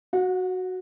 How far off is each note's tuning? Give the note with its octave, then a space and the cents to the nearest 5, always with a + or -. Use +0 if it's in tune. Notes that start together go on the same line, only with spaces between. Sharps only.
F#4 +0 F#5 -35